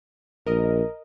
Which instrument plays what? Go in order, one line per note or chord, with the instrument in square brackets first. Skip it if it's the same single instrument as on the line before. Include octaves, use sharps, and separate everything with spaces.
[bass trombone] A#1 [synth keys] A#4 D#5